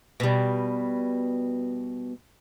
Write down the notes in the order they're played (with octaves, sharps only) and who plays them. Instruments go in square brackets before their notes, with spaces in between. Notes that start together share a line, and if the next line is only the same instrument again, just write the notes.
[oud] B2 G3